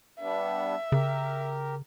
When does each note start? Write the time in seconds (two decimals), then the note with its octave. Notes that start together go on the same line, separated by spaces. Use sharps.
0.20 G3 B3 D4 E5
0.92 C#3 G4 A#4